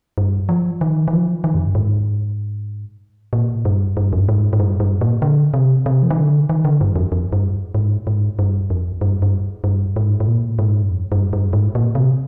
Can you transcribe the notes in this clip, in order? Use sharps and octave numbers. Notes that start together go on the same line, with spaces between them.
G2
F3
D#3
D#3
F3
D#3
F2
G2
G#2
A#2
G2
G2
F2
G2
G#2
G#2
G2
G2
A#2
D3
C3
C3
F3
D#3
D3
D#3
D3
G2
F2
F2
G2
G#2
G#2
G2
F2
G2
G2
G2
G#2
G#2
A#2
G#2
G2
F2
G2
G2
G#2
A#2
C3